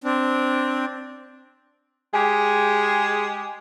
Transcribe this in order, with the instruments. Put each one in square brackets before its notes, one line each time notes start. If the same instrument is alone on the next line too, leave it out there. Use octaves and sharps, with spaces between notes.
[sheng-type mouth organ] C4 D4
[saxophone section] G#3 G4 G#4